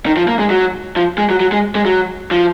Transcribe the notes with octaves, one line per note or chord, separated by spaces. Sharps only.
D#3
F3
A#3
G#3
F#3
F3
G#3
F#3
F#3
G#3
G#3
F#3
F3